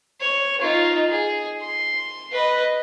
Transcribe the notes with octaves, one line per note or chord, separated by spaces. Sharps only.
C#5
D#4 F4
G#4
C6
B4 D#5